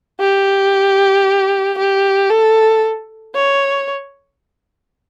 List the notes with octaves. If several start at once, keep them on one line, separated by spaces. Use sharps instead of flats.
G4
G4
A4
C#5